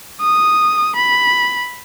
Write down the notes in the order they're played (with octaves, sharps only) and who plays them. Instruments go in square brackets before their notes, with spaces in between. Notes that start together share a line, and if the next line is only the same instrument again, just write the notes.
[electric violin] D#6
B5